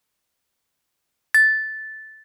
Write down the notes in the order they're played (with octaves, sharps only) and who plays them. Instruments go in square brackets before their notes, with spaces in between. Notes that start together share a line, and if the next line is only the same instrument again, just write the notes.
[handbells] A6